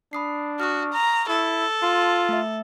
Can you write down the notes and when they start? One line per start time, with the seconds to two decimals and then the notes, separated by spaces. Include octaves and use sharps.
0.13 D4 B5 D#6 C7
0.60 F#4 C#6 D#6 F6
0.93 A#5
1.29 E4 A4
1.82 F4 A5 C6
2.29 A3 E5